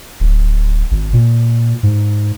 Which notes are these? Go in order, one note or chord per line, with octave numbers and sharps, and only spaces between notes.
D1
G#1
A#2
G#2